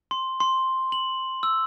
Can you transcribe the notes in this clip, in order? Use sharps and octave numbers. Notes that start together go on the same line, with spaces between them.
C6
C6
F#7
E6